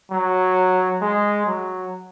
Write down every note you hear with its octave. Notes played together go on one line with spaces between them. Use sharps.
F#3
G#3
F#3